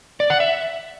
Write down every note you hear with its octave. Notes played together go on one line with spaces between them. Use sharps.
D5
F#5
E5